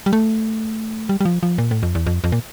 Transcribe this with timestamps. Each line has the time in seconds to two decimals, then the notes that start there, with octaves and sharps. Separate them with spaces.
0.06 G3
0.13 A3
1.09 G3
1.21 G3
1.25 F3
1.43 F3
1.58 A#2
1.71 A2
1.83 F2
1.95 E2
2.07 F2
2.24 F2
2.32 A#2